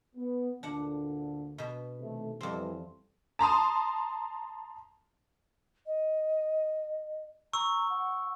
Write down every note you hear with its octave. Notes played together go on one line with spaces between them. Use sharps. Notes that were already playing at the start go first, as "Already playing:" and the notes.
B3
D2 A#2 D3 D4 F#5
B2 B4
C3 D#3 A3
F2 E3 G3 C4
A5 A#5 C6 D#6
D#5
A#5 C#6 E6
F#5